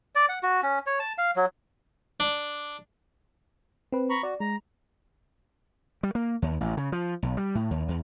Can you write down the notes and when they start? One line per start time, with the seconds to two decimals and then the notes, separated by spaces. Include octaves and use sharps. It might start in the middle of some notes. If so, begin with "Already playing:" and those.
0.15 D5
0.29 F#5
0.43 F#4
0.63 C#4
0.86 C#5
0.99 A5
1.18 F5
1.36 F#3
2.20 D4
3.92 C4 B4
4.10 A#5 B5 C#6
4.23 F#4 D5
4.40 G#3 A#5
6.03 G3
6.15 A#3
6.42 D#2
6.61 A1
6.77 C#3
6.92 F3
7.22 B1
7.37 G3
7.55 A2
7.71 D#2
7.89 E2